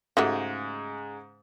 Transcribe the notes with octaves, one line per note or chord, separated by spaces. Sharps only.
G#2 C#3 G#3 A3 F#4 G4